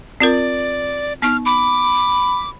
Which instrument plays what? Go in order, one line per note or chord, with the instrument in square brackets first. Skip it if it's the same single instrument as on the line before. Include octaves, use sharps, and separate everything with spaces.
[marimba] C4 F4 A#4 [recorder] D5
[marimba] B3 D#4 [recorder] F6
[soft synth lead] B5 [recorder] D6